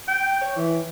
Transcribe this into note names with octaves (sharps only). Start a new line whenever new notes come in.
G5
C#5
E3